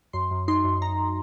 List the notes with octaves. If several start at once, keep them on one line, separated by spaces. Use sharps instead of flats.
F#2 C6
F#2
D#4 C6
F#2
D#4 A#5